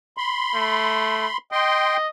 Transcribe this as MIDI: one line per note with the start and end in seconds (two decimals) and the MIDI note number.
0.17 1.37 83
0.17 1.37 84
0.55 1.26 57
1.52 2.07 75
1.52 1.97 79
1.52 1.97 84